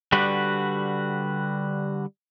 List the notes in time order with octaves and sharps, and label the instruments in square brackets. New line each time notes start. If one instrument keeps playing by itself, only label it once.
[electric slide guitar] D3 G3 F#4 G4 B4